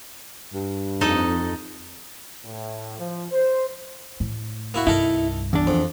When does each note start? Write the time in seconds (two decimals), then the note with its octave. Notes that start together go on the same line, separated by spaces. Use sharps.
0.54 G2
1.01 F2 D#4 A4 D#5
2.45 A2
2.98 F3
3.31 C5
4.20 A2
4.74 A#3 E4 F#4
4.87 C2 G2 D#4 E4 A4 A#4
5.53 E2 D4
5.67 F2